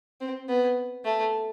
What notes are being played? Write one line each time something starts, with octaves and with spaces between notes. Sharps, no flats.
C4
B3
A3